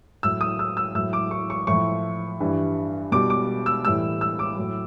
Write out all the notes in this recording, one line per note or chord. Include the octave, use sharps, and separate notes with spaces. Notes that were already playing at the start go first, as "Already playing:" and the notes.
A2 F#3 E6
D#6
E6
E6
A2 F#3 E6
D6
C#6
C#6
A2 F3 C#6
G2 E3 G3
B2 G3 D6
D6
E6
A2 E3 G3 E6
E6
D6
A2 F#3